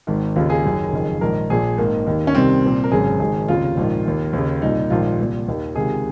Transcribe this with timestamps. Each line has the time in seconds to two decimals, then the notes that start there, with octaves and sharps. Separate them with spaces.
0.07 G#1 G#2 D#3
0.36 D#2 C#3 F4
0.50 G#4
0.65 F#1 F#2 D#3
0.92 F#1 F2 D#3
1.21 A#1 G#2 D#3 A#4
1.50 A#1 A#2 G#4
1.78 G#1 G#2 D#3 A#3
2.06 D#2 D#3
2.27 C#4
2.35 C2 C3 D#3 C4
2.64 C2 A#2
2.84 A#4
2.92 G#1 F#2 C#3 G#4
3.20 G#1 G#2 D#3 G#4
3.48 F1 D#2 C#3 F4
3.77 A#1 G#2 D#3
4.06 D#2 D#3
4.33 D#2
4.38 C#3
4.62 C2 A#2 D#4
4.90 A#1 G#2 D#3 F4
5.19 C2 A#2
5.48 D#2 D#3
5.75 C#2 C3 D#3 G#4